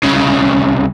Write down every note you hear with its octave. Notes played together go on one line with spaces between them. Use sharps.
C2 C#3